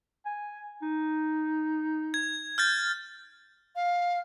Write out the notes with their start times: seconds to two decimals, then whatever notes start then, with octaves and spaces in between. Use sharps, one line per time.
0.26 G#5
0.82 D#4
2.14 G#6
2.58 F6 G6 A6
3.76 F5